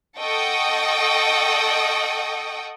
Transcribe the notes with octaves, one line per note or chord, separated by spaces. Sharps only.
A4 D#5 F#5 G5 C#6 D#6